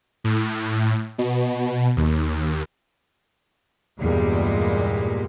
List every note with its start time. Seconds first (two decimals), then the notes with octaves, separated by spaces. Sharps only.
0.24 A2
1.18 B2
1.97 D#2
3.99 E2 G2 A#2 G3 G#3